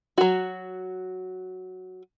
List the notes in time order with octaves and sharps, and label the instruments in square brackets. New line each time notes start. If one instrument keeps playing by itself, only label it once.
[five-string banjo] F#3 F#4